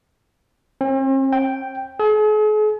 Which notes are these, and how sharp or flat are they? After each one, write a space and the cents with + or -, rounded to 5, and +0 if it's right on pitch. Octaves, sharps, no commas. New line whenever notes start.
C4 +45
G5 +0
G#4 +45